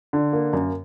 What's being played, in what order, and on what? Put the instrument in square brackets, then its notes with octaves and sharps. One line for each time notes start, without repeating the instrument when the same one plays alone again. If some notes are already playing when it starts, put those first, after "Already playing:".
[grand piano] D3
A#3
F#2